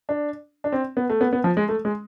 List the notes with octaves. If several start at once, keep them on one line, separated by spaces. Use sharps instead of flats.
D4
D4
C4
B3
A3
B3
B3
F3
G#3
A3
G#3